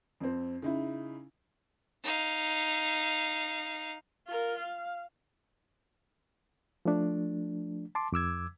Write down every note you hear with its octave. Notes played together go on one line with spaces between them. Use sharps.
F2 C4
C#3 D#4 E4
D#4 F5
F4 A#4
F5
F3 A3 D4
A5 C6 D6
F2 D6 E6 G#6